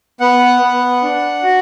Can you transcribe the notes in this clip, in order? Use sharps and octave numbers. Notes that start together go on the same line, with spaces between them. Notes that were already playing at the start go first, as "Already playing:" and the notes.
B3 F#5
B3
D4
F#4